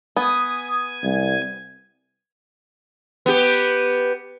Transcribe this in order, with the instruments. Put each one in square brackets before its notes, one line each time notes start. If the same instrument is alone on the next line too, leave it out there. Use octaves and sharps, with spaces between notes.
[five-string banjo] B3 [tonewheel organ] G#5 [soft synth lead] D#6
[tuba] C2 [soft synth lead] G#6
[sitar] B3 G4